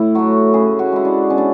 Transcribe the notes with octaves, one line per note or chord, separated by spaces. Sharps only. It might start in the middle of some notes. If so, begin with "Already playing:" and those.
Already playing: A2 E4
F#3 A3 F#4
C#3 G#4
F#4
G#3 E4
D4
B2 C#4
D4